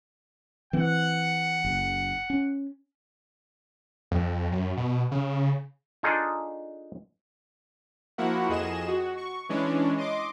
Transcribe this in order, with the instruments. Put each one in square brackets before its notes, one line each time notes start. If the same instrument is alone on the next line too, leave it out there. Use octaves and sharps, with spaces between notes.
[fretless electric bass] E3 C4 [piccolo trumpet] F#5
[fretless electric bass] F#1
C#4
[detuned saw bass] F2
F#2
B2
C#3
[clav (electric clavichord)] D4 D#4 F4 G#4 A4
[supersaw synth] F3 A#3 E4 F#4 F#5
F2 G#4 D#5 E7
F#4
C#6
E3 G#3 C#4 D4
D#5 C6 D6